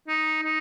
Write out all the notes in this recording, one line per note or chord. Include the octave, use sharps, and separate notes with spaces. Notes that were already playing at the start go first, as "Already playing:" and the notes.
D#4
D#4